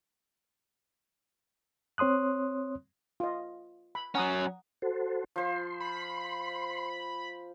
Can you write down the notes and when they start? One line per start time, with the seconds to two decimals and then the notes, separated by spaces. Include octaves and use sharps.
1.98 C4 C#5 C6 D#6 F#6
3.20 F4 D#5
3.95 B5
4.15 F#3 C#4 F#5 A#5 D#6
4.82 F#4 A4 C5
5.36 F3 C5 C6
5.80 B5